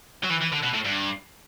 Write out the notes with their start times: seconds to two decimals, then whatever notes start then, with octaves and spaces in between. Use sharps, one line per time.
0.23 F#3
0.30 E3
0.41 E3
0.52 D3
0.63 B2
0.74 A2
0.85 G2